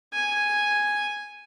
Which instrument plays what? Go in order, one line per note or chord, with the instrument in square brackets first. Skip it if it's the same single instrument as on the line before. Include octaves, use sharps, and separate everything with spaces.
[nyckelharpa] G#5